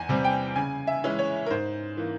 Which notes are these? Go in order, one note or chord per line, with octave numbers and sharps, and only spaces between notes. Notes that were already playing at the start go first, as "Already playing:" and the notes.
Already playing: E2 G#5
C3 G3 C4
G5
C#3 G#5
E5
E3 G#3 C#4 E4
C#5
A#4
G#2 C5
E3 A#3